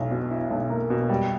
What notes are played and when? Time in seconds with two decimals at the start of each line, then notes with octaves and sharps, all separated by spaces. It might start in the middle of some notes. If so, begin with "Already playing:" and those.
Already playing: B1 E4
0.11 B2
0.31 E4
0.51 B1
0.70 A#3
0.90 B2
1.09 G3